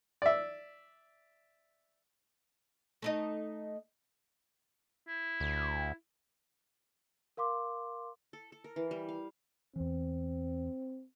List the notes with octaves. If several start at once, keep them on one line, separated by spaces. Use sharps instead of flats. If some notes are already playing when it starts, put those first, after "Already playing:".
D5 E5
A3 D#4 D#5
E4
D2
A#4 F5 C6 D6
A4
A4
A#4
E3
G3
F5
E2 E3 C4